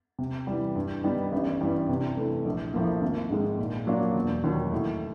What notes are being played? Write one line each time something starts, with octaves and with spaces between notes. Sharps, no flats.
C3
E3 G3
G2
D#3 G3 B3 D#4
A1
G2 E3 G3
C3
E3 A3
A#1
A2 F3 A#3
G#1
G#2 D#3 G#3
A#2
F#3 A#3 D4 F4
E1
D#2 D#3 F#3
A2